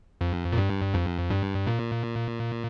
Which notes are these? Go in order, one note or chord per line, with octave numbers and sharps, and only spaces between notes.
F2
A#2
G2
F2
G2
A#2